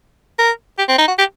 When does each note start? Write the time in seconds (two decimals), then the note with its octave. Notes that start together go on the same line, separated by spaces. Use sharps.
0.39 A#4
0.78 G4
0.88 C4
0.98 D#4
1.08 F#4
1.19 G4